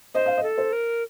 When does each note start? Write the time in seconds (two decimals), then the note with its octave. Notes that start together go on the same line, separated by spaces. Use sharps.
0.14 C5 D#5
0.26 F5
0.37 D#5
0.43 A4
0.58 C5
0.73 A#4